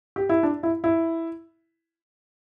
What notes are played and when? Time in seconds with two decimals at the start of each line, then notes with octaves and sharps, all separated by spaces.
0.16 G4
0.29 E4
0.43 D4
0.63 E4
0.84 E4